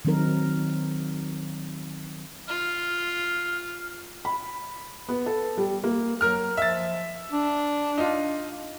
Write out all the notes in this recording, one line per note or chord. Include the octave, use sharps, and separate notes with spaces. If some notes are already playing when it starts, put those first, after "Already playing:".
D#3 F#3 C4 D#4 A#4
F4 F6
B5
B3
A4
G3
A#3
F#3 A#4 F6
F3 E5 A6
D4
D#4 F4